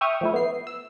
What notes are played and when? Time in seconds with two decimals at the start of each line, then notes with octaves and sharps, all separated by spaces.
0.01 E5 G5 C#6 D#6 F6
0.21 F3 A3 E4
0.33 B3 C7
0.67 E6